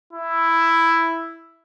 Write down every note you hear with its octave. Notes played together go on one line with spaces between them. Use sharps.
E4